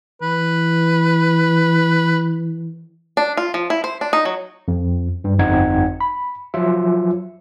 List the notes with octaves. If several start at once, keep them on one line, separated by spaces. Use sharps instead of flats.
E3 B4
D4
F4
F3
E4
C5
D4
D#4
F#3
F2
G2
G1 F2 C4 D#4 F#5 G#6
B5
F3 F#3 F4 E5